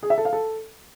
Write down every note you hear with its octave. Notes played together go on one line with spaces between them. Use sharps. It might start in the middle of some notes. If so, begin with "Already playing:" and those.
G#4
E5
A4
F5
A4